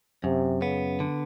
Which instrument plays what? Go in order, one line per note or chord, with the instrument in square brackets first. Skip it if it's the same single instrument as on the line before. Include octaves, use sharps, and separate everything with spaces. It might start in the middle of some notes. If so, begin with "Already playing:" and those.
[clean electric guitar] F#2 [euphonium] C3
[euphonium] C#3 [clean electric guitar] B3
[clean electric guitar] D3